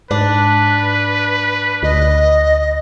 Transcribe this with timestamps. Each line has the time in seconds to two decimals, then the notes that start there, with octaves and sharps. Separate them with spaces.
0.11 G#2 D4 B4
1.83 D2 D#5